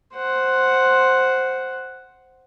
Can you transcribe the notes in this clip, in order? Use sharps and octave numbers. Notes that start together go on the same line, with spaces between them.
C5 F#5